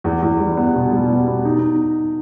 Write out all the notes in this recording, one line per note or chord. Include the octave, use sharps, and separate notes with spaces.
E2
E2
G3
B3
B2
G3
B3
B3
D#4